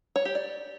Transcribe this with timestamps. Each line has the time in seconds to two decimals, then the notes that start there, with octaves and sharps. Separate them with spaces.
0.16 C#5
0.25 G4
0.35 D5